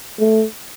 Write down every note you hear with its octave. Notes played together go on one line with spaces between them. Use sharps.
A3